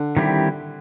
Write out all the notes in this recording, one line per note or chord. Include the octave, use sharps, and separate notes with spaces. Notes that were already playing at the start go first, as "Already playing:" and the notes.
Already playing: D3
D#3 G3 C4 E4 G4